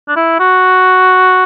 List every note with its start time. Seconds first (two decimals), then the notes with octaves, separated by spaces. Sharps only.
0.08 D4
0.16 E4
0.39 F#4